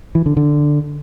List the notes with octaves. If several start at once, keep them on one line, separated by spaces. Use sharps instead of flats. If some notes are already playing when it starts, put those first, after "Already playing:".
E3
D3
D3